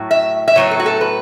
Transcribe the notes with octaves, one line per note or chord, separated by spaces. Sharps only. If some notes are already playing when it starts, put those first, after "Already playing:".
Already playing: A2 F#3
E5
E5
A2 F#3 B3 C#5
A4
F#4
A4
B4